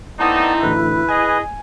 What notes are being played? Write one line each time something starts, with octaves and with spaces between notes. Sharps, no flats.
A3 B3 C4 D#4 E4 D5 A5
A1 D2 D3 B4
G#4 D#5 G#5